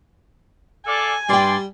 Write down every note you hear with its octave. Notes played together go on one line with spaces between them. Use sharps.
A4 D5 F5 G#5
G2 G3 D5 G5 C6